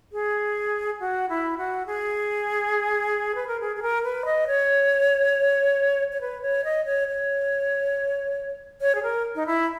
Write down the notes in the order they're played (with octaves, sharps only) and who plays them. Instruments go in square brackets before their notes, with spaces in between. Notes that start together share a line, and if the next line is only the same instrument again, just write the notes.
[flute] G#4
F#4
E4
F#4
G#4
B4
A#4
G#4
G#4
A#4
B4
D#5
C#5
C#5
B4
C#5
D#5
C#5
C#5
C#5
G#4
A#4
D#4
E4